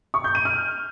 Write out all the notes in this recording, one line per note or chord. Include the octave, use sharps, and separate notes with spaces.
C#6
G6
D#7
F6